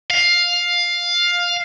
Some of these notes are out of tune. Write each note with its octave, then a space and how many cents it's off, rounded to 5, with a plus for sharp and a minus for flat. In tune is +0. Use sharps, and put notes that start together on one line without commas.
F5 +10